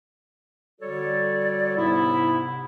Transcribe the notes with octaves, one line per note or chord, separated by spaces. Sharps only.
D3 G3 F#4 A4 C#5 D5
G#2 C3 B3 E4